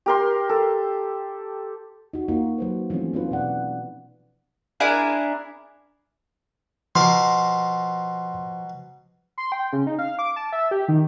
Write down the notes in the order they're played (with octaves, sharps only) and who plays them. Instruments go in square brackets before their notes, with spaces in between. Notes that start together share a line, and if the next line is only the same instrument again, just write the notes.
[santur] G4 A#4 C6
A4
[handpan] D#4 F#4
A#3 D#4 F4 F#4
F#3 B4 C5
E3 F3 A3 C4 C#4
B3 C#4 D#4 F4 B4
B2 D5 F#5
[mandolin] D4 E4 G#4 A#4
[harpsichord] B2 A#4 D6 [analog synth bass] F3 [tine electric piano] C6
[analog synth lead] C6
G5
C#3
D#4
F5
D6
A5
E5
G4
D#3